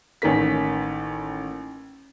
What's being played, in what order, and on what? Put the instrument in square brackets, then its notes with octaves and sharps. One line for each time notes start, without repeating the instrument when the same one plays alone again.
[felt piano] A1 D#3 A#3 B6